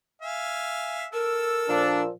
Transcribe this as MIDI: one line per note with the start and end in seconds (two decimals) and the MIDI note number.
0.22 1.06 76
0.22 1.06 77
0.22 1.06 80
1.13 2.05 69
1.13 1.82 70
1.13 2.05 88
1.69 2.08 46
1.69 2.08 53
1.69 2.02 62